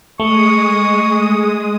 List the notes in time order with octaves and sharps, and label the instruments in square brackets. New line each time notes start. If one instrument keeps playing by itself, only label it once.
[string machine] G#3 D#6 [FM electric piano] A3 [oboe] C#6